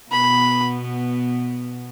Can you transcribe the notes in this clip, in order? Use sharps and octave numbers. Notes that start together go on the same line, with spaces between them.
B2 B3 B5